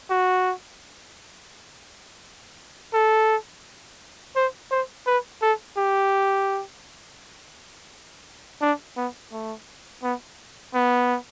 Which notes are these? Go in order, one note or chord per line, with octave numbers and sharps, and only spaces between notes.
F#4
A4
C5
C5
B4
A4
G4
D4
B3
A3
B3
B3